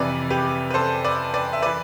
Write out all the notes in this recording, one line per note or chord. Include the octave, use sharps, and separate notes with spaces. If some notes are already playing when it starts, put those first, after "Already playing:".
Already playing: F2 C3 E3 B4 D5
G4 B4
B4
A4 C5
B4 D5
B4 D5
E5
E3 B4 D5